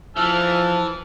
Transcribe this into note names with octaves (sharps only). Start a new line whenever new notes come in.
E3 F3 A5 E6 F6